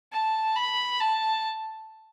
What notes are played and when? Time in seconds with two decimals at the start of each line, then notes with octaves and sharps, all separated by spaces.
0.12 A5
0.56 B5
1.00 A5